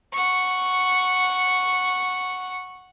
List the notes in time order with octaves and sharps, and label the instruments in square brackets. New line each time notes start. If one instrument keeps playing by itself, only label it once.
[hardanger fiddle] F#5 C#6